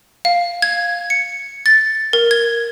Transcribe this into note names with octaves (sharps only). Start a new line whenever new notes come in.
F5
G#6
C#7
A6
A#4
G#6